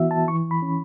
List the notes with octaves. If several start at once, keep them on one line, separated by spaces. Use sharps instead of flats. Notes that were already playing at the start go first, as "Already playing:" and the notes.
Already playing: E3 B3 F#4 E5
A5
E3 C#6
B5
C#4